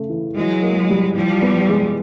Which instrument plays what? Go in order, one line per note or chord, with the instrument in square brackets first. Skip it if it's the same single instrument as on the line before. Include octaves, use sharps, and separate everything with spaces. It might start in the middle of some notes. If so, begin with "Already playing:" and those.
Already playing: [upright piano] C#3 A3
E3
[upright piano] E3 [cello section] F#3 G#3
[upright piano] A#3
G3
[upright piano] E3 [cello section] F3 G3
[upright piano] B3
G#3